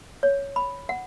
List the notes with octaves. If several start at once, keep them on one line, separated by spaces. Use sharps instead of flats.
C#5
B5
F#5